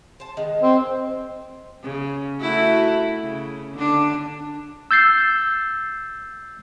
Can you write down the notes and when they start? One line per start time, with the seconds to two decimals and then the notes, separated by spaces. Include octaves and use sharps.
0.20 C5 A5
0.37 D#3 G#3 B3
0.62 C4
1.83 C#3
2.40 A3 E4 F#4
3.22 C#3
3.75 D3 D4
4.91 E6 G6 A6 C7